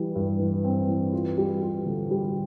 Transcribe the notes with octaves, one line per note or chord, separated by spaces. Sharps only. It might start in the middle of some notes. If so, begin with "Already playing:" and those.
Already playing: E3 G3
G2
E3
C4
E3
F4
G3
F4
D3
G3